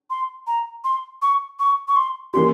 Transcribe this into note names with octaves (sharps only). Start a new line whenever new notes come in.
C6
A#5
C6
C#6
C#6
C#6
C6
E3 A#3 C#4 G4 C6